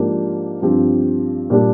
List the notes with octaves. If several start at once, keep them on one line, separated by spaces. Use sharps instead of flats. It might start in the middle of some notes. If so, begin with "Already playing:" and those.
Already playing: G#2 F3 A#3 D4 G4
G2 F3 C4 G4
A#2 G3 D4 G4